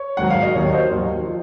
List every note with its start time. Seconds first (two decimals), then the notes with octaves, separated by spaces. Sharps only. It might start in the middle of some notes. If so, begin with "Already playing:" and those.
Already playing: C#5
0.17 G#2 D#3 F#3 F#5
0.30 F5
0.43 D#5
0.55 D#2 D#3 F#3 C#5
0.73 C5 D#5
0.91 D#2 D#3 F#3
1.27 F3